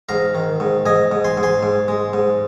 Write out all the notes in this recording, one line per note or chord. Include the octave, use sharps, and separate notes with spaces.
G#2 F5 A#5
D#3
G#2
G#2 D#5 G#5
G#2
G#5 C6
G#2
G#5 C6
G#2
G#3
G#2